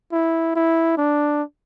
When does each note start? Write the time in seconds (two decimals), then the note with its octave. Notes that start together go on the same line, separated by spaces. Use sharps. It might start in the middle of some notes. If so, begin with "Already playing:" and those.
0.12 E4
0.55 E4
0.98 D4